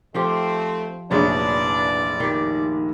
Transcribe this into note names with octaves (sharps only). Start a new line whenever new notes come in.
F3 A3 C4 F4 G4
F1 A#1 E3 F#3 G#3 D4 C#5 D5
D#3 G4